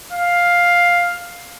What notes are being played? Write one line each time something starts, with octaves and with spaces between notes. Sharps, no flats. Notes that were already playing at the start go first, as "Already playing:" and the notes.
F5